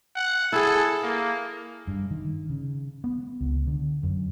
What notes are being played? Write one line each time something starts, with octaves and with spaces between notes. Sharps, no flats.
F#5
E4 G#4 A4
A#3
G2
D#3
C#3
B3
C#2
D3
F#2